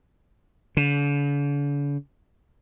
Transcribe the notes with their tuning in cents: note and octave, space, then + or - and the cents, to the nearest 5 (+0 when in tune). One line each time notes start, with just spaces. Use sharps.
D3 -45